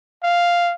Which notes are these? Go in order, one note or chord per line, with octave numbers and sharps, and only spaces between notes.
F5